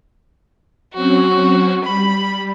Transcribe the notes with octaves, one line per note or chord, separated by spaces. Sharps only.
F#3 C4 C#4 F#4
G3 B5